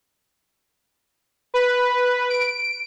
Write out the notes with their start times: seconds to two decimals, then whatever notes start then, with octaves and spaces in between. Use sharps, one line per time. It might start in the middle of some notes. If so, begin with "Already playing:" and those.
1.54 B4
2.30 D7